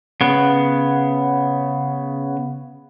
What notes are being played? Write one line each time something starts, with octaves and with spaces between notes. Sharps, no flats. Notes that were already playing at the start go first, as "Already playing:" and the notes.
C#3 B3